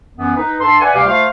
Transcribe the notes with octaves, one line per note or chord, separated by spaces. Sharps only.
F#2 E3 B3
D#4 B4
G2 A4 A5 C6
B4 D5 E5 F#5 G#5
D2 C3 G3 G4 F5
A3 F4 C5 F5